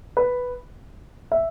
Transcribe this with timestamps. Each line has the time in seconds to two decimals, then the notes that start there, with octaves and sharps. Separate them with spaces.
0.17 B4
1.32 E5